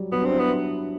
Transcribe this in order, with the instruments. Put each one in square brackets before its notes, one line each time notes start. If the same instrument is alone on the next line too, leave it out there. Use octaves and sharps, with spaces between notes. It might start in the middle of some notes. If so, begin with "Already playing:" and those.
Already playing: [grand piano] F#3 G3
[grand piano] F#3 [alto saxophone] B3
[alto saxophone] C4 [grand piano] D4
[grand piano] E4
[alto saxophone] B3